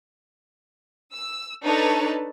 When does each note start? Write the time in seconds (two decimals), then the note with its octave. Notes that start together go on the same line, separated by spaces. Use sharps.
1.12 E6
1.64 D4 D#4 A4 B4 C#5 A5